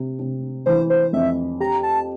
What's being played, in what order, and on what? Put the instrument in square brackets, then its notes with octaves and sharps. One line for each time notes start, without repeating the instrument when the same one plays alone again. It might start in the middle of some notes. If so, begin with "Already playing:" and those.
Already playing: [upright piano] C3
C3
[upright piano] E3 [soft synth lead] C5
[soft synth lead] C5
[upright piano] F2 [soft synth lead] E5
[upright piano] G4 [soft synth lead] A#5
[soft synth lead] A5